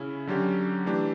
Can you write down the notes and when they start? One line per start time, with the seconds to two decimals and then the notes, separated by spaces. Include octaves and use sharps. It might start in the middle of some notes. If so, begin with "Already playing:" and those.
Already playing: C#3 C#4 E4
0.27 D3 F#3 C#4 G4
0.86 E3 A3 D4 G4